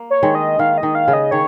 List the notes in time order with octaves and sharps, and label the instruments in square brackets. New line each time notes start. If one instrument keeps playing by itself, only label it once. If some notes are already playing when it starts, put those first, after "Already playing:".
Already playing: [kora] A#3
[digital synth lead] C#5
[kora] D#3 G#3
[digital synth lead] D#5
[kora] D#3 [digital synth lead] F5
[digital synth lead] D#5
[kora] D#3
[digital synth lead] F5
[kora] C#3
[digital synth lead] D#5
[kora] D#3 [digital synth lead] C#5